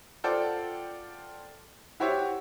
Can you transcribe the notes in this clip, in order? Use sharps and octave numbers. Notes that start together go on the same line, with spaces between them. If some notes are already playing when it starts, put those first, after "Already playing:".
F4 A4 C5 D5 F#5 G5
E4 F#4 G4 C5 C#5 E5